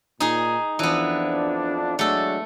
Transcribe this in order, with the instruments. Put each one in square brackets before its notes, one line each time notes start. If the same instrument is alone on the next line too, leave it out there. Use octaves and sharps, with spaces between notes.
[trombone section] A#2 [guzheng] D#4 G#4
[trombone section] F2 F3 D4 [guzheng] E3 B3
[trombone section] F#3 G#3 D4 [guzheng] A3 A4